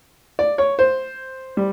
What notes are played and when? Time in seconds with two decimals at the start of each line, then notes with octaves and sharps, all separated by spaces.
0.39 D5
0.58 C#5
0.79 C5
1.57 G3